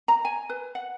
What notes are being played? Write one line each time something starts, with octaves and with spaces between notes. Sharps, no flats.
A#5
G#5
B4
F#5